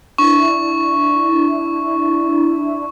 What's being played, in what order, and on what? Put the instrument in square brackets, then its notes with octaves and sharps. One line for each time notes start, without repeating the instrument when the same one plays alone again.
[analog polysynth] D4 E4 [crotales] C#6